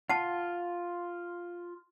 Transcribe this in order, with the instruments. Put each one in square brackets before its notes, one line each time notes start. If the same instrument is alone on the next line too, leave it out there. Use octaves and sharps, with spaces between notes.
[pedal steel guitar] F4 [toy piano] F#5 A5